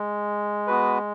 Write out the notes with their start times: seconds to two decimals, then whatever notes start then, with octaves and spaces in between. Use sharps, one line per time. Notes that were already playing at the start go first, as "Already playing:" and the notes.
Already playing: G#3
0.67 B3 F#4 B4